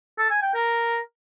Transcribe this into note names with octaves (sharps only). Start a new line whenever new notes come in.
A4
G#5
G5
A#4